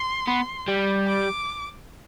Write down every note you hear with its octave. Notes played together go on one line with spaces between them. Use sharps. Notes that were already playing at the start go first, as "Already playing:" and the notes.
Already playing: C6
B3
G3
D6